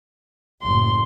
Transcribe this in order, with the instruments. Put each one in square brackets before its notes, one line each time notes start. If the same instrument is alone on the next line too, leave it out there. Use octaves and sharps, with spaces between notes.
[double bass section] F#1 A2 [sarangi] C6